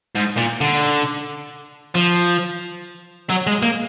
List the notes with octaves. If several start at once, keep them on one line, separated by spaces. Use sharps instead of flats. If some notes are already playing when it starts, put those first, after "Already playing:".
G#2
A#2
D3
F3
F#3
G#3
A#3